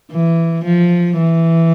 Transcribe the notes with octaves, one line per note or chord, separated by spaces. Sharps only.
E3
F3
E3